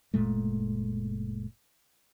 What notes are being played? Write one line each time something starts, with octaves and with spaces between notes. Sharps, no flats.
F#1 A#2 G#3 A3